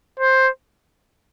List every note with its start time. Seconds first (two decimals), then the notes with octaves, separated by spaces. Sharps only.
0.19 C5